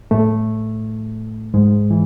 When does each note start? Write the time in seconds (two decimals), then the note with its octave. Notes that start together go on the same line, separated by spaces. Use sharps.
0.11 A2 A3
1.54 G#2 G#3
1.91 E3